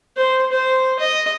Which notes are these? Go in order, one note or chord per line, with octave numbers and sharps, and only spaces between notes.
C5
C5
D#5